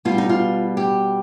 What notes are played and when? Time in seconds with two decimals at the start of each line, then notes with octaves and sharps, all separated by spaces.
0.05 B2 G3 B3 F4
0.18 D#4
0.29 F4
0.77 G4